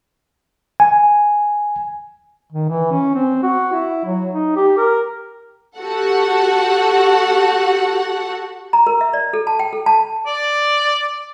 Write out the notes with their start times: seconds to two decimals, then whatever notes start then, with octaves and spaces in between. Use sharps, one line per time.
0.80 G#5
2.53 D#3
2.69 E3
2.91 C#4
3.15 C4
3.43 F#4
3.72 E4
4.06 F#3
4.31 D#4
4.56 G4
4.78 A#4
5.78 F#4 G4 A4 F#5
8.73 A#5
8.87 A#4
9.01 E5
9.13 D5
9.33 A4
9.47 A5
9.59 G5
9.73 A4
9.86 A5
10.27 D5